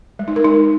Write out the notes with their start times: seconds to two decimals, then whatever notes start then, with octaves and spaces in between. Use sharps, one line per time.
0.19 G#3
0.28 D#4
0.36 A#4
0.45 D#4